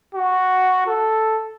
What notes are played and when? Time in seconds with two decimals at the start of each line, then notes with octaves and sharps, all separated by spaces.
0.15 F#4
0.86 A4